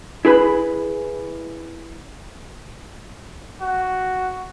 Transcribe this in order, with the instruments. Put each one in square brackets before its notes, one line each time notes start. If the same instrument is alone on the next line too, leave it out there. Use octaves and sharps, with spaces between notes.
[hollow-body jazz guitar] E4 G#4 B4 B5
[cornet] F#4